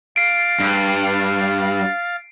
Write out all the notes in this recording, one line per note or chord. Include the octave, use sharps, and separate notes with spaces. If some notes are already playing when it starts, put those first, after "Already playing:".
F5 A6 C7 D7
G2